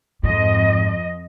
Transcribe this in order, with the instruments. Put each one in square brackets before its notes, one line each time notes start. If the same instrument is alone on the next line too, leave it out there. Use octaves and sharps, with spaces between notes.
[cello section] F2 D#5 [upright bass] G#2